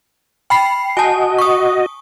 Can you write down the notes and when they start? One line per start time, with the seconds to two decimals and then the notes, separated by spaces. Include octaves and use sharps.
0.50 G5 B5 C7
0.97 F#4 D#5 G#5 A5
1.38 C#6 D#6